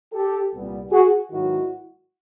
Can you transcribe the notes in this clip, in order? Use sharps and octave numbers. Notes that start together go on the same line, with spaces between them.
G4 A4
C2 A#2 G3 B3
F#4 G#4
G#2 D#3 F#3 B3 E4 F#4